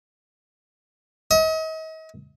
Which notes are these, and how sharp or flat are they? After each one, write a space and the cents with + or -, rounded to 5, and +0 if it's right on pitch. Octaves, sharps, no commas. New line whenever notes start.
D#5 +40